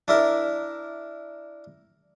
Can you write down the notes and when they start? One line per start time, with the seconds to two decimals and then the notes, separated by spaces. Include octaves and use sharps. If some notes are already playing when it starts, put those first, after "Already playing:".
0.08 D4 E4 A#4